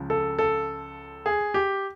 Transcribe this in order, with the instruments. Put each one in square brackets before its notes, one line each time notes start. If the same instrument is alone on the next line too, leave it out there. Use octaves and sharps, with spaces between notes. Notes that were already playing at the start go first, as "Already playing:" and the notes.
Already playing: [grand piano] C#2 C#3 F3
A4
A4
G#4
G4